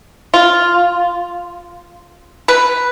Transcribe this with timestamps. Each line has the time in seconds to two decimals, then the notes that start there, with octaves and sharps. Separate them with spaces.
0.34 F4
2.48 B4